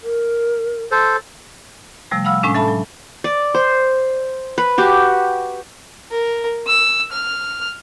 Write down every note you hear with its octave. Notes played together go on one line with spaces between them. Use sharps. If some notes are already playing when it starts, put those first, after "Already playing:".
A#4
A4 C5
C3 F3 G3 A3
F5 F#5 B5 E6 F6
A2 G#3 C#4 D4
A4 E5 A5 B5
F#3
D5
C5
B4
F#4 G4
A#4
E6
F6